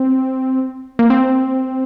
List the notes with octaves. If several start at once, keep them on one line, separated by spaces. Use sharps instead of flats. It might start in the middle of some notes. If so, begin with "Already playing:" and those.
Already playing: C4
A#3
C4